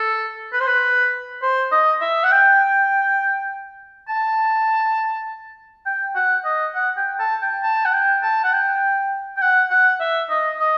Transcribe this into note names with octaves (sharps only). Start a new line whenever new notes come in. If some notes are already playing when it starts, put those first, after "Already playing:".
Already playing: A4
B4
C5
B4
C5
D#5
E5
F#5
G5
A5
G5
F#5
D#5
F#5
G5
A5
G5
A5
F#5
G5
A5
F#5
G5
G5
F#5
F#5
E5
D#5
D#5